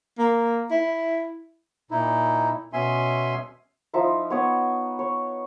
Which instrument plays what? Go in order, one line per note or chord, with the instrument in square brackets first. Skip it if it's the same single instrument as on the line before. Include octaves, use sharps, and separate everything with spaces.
[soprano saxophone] A#3
E4
[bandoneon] A#2 D#4 E4
B2 B3 C#4 E5 G#5 C6
[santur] F3 D#4 E4 E5
B3 C#5 D#6
C#5